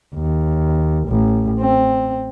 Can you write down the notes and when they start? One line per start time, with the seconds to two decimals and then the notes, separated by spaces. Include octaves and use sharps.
0.15 D#2
1.08 A1
1.60 C4